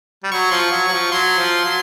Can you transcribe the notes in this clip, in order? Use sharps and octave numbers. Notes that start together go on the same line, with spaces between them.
G3
F#3 C#6
F3 C6
C#6
F#3
F#3 C#6
F3
F#3 C6
F3
F#3